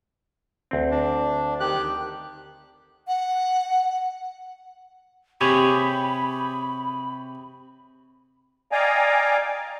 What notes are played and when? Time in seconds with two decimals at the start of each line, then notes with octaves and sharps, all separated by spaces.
0.71 D2 C4
0.91 D4
1.60 D#3 G4 F#6
3.08 F#5
5.41 C3 G4 G#4 C#5 B5
8.72 D5 D#5 F5 G5 G#5 A#5